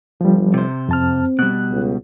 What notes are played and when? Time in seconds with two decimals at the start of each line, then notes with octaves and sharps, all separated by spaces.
0.21 G1 F3 G3
0.54 C3 C5
0.89 F2 C4 A5 F6
1.39 B2 G3 F#6
1.71 C#2